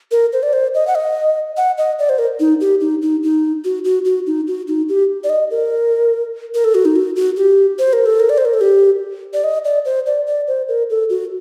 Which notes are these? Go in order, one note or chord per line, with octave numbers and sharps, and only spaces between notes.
A#4
C5
D5
C5
D#5
F#5
D#5
F#5
D#5
D5
C5
A#4
D#4
G4
D#4
D#4
D#4
F#4
F#4
F#4
D#4
F#4
D#4
G4
D5
D#5
A#4
A#4
A4
F#4
D#4
F#4
F#4
G4
C5
A#4
A4
A#4
D5
C5
A#4
A4
G4
D5
D#5
D5
C5
D5
D5
C5
A#4
A4
F#4